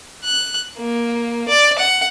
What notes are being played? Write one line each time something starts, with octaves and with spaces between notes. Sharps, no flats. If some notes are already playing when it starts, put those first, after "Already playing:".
F#6
A#3
D5
F#5